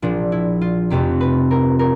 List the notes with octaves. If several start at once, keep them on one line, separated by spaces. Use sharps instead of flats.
A#1 A#2 F3 D4
E4
F4
F1 F2 C3 G4
B4
A#4
A#4